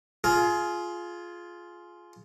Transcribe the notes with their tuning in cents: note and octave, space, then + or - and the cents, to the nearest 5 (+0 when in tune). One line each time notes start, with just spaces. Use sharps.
F4 +0 G#4 +25